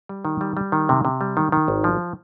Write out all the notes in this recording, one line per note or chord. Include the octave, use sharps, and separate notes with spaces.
G3
D#3
G3
G3
D#3
C3
C3
G3
D#3
D#3
G#1
F3